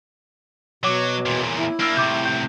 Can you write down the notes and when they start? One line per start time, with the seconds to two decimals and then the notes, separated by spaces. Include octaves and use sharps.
0.84 B2 F#3 C#5 D6
1.26 E2 A#2
1.59 E4
1.80 A#3 D4 E6 F6
1.97 A2 C3 D6 G6
2.25 G6